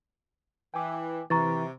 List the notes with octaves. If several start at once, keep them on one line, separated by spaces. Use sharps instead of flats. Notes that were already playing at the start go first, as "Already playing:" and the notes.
E3 G5 G#5 D6
C3 E3 E4 B4 A#5 C#6 A6